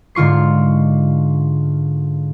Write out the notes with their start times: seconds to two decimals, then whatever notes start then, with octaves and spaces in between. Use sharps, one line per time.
0.15 G#2 D3 F4 C#6 C7